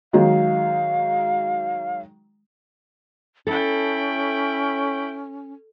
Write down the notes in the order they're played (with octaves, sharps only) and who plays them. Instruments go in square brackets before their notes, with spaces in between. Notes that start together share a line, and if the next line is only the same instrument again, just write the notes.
[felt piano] D#3 F#3 G#3 [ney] F5
[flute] C#4 [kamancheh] E4 G5 [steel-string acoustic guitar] A4